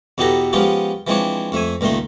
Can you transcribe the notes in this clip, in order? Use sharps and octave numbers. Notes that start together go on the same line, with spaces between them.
E2 B2 B3 G4 A4 A#5
F3 G#3 B3 C#4 F4 G4
E3 F3 G#3 C4 D4 C#5
F2 A3 E5 G#5
C#2 A#2 D#3 A3 C6